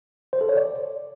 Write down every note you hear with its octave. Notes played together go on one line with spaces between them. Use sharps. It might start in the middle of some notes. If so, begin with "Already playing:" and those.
C5
A4
C#5
D5